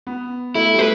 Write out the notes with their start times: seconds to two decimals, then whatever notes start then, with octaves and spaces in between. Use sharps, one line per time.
0.07 B3
0.55 A3 E4
0.74 G3
0.79 A3 B4